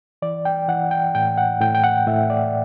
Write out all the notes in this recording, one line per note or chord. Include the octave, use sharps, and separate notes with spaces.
E3 D5
G5
E3 F#5
G5
A2 G5
F#5
A2 G5
G5
F#5
A2 E5
D5